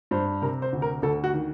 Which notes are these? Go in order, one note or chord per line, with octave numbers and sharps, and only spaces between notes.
G2 C5
C3 A#4
C5
D2
A#4
D2 A4
F#4
D#3